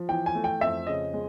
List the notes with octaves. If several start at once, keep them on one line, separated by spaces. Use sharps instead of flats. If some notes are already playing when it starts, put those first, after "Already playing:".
Already playing: F3
E3 G5
G#5
A3
G5
F2 E5
C#3 D#5
G#3